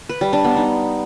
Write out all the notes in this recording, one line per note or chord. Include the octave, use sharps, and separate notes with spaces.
B4
G3
D4
B3
D#4